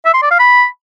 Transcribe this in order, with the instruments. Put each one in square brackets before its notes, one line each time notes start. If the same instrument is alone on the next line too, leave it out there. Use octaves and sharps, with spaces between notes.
[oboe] E5
C6
D5
F5
B5